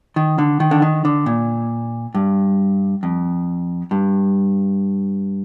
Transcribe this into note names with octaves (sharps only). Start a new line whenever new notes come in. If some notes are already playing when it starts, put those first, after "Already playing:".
D#3
D3
D#3
D3
D#3
D3
A#2
G2
F2
G2